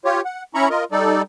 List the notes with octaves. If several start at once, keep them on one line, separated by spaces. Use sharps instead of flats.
F4 G4 C#5
F#5
C#4 E4 A#5 B5 C#6
F4 A#4 D#5
G3 D#4 A4 D5